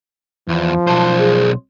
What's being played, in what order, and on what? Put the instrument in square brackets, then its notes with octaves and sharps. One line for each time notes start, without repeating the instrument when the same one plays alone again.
[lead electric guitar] E2 [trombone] F3
[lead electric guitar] B1 C5 [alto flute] A5
[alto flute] G#4